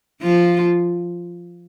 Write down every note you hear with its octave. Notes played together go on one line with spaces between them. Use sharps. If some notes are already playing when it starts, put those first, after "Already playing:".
F3 F4